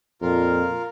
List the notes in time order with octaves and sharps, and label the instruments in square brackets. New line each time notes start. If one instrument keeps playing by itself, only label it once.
[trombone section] F2 A#2 [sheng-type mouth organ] F4 A#4